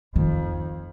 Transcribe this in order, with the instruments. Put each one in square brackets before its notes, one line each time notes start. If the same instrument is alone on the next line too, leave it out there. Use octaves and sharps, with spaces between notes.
[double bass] F2 [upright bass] D#3